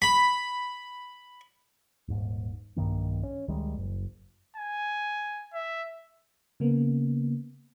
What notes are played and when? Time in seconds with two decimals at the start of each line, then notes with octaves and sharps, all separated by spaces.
0.02 B5
2.08 D#1 G#2
2.76 B1 G2 D#3 A#3
3.23 C#4
3.48 D2 D#3 G3 G#3
3.77 F#1
4.57 G#5
5.53 E5
6.60 C#3 A#3 B3